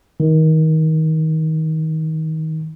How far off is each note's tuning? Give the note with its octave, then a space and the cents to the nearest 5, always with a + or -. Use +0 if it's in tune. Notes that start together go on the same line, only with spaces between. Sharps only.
D#3 +25